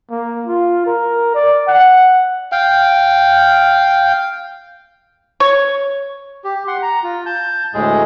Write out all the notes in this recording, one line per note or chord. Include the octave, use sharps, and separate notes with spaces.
A#3
F4
A#4
D5
F#5
F5 G5
C#5
G4
F#5 C6
A#5
F4
A5 G6
D2 A2 G#3 G#4